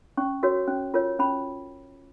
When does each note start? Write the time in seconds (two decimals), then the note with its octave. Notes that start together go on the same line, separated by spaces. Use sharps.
0.17 C#4 C#6
0.43 F#4 A#4 C#5
0.68 C#4
0.94 F4 A#4 C#5
1.19 C#4 B5